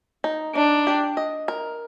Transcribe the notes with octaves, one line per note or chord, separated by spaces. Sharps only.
D#4
D4 D#4
G4
D#5
A#4